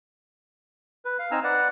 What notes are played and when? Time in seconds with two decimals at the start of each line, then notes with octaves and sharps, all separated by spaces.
1.05 B4
1.19 F5
1.31 C4 D#4 G#5 A#5 E6 F6
1.44 B4 D5 F#5